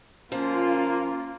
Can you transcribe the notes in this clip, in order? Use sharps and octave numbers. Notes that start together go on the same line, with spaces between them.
F3 A#3 C#4 F4